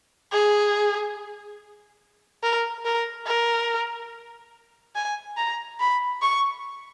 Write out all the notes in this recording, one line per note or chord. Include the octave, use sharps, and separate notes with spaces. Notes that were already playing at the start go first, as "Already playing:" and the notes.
G#4
A#4
A#4
A#4
G#5
A#5
B5
C#6